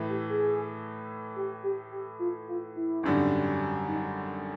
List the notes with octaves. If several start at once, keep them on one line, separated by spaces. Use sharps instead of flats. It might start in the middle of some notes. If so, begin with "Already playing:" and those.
Already playing: A2 E3 A3
G4
G#4
G4
G4
G4
F4
F4
E4
G#1 F#2 D3 G3
D#4